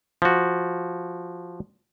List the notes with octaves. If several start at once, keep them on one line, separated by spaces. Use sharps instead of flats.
F3 F#4